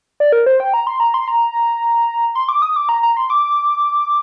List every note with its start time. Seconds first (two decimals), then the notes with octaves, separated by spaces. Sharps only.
0.20 D5
0.32 A#4
0.46 C5
0.60 G5
0.74 A#5
0.87 C6
1.00 A#5
1.14 C6
1.28 A#5
2.35 C6
2.49 D6
2.62 D#6
2.76 D6
2.89 A#5
3.03 A#5
3.17 C6
3.30 D6